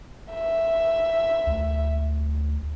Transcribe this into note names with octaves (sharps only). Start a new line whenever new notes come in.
E5
D2